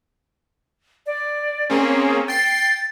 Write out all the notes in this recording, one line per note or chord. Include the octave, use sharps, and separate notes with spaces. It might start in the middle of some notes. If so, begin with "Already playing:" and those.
D5
A#3 C4 C#4 G#4
G5 A6 C7